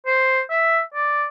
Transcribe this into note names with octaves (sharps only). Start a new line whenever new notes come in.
C5
E5
D5